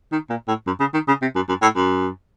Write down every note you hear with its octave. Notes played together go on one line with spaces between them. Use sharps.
D#3
A#2
A2
F#2
C#3
D#3
C#3
C3
F#2
F#2
A2
F#2